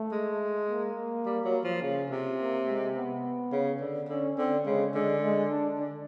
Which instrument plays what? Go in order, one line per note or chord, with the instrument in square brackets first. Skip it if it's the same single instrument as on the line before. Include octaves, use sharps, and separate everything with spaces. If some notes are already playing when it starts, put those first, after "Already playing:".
Already playing: [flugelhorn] A3
[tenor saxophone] G#3
[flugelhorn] A#3
[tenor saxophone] G3
F#3
F3
C#3
C3
[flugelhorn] A#3
G#3
B3
[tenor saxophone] C#3
D3
[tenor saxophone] D3 [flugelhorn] C#4
[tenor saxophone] D3 [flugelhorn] C4
[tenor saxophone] C#3 [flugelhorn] G#3
[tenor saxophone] D3 [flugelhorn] G#3
[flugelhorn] G#3
D4
[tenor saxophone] D3